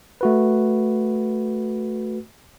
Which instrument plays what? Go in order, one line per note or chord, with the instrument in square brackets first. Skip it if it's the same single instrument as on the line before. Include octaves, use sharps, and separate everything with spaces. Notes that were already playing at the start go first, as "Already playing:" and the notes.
[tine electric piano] A3 F#4 B4